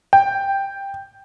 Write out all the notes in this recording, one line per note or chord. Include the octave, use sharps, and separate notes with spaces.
G5